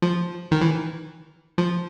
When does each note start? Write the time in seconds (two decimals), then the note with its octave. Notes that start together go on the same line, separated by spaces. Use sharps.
0.02 F3
0.51 D#3
0.61 E3
1.58 F3